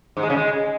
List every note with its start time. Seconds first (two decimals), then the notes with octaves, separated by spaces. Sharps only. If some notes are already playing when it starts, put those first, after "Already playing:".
0.17 G#2
0.23 G#3
0.30 C#3
0.36 G#3